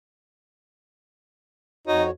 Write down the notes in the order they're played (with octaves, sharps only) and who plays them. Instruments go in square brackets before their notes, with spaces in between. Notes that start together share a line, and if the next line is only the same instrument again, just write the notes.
[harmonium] F2 F#4 C#5 [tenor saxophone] D#4